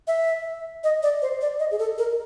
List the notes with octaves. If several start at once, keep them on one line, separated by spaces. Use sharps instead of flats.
E5
D#5
D5
C5
D5
D#5
G#4
A4
A#4